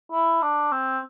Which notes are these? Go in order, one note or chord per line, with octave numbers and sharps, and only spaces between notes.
E4
D4
C4